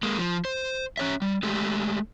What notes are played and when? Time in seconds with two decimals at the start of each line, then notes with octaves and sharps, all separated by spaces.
0.03 G#3 A#3
0.18 F3
0.45 C5
0.97 C#4 C#5 E5
1.22 G3
1.43 G#3 A3 G4 A4